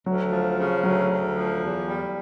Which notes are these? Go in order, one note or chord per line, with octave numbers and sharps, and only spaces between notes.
D2 F#3
F3
C#3
D2 F#3
D2
F3
E2
G3